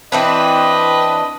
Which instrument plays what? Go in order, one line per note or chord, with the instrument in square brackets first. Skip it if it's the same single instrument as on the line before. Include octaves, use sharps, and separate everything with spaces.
[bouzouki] E3 C4 D4 [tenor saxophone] B4 [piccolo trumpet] D#5